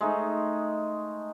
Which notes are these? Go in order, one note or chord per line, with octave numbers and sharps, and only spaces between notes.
G#3 A3 D#4